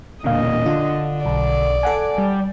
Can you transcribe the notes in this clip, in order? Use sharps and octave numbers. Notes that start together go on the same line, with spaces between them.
E1 A#2 D3 D#5 F5
D3 F4
B1 D5
A4 F#5 G#5
G3